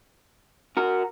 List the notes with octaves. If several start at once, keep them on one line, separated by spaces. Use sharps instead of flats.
F#4 A#4